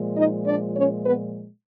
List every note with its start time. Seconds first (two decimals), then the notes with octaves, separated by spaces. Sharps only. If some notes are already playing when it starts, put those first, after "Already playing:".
Already playing: A#2 F3 G#3
0.16 D#4 D#5
0.46 D4 D5
0.76 C#4 C#5
1.05 B3 B4